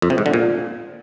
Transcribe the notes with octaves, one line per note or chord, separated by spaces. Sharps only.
F2
C3
G#2
D3
A#2